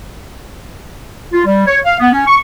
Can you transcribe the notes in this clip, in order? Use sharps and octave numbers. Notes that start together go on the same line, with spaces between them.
F4
G3
C#5
F5
B3
C#4
C#6